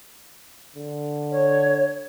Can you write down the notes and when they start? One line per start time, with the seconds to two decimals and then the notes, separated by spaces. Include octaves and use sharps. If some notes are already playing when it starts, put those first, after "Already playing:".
0.76 D3
1.31 C#5